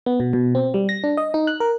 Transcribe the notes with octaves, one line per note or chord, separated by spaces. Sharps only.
B3
B2
B2
C4
G3
A#6
D4
D#5
D#4
F#6
A#4